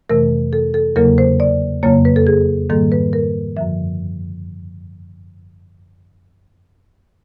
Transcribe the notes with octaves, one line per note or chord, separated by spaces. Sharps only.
F2 C3 E3 A3 A#4
A4
A4
E2 C#3 F#3 A#3 A#4
C5
D5
F2 C#3 F#3 A#3 C#5
B4
A4
G#4
G#2 D#3 G3 A#3 A4
B4
A#4
F#2 D3 F3 E5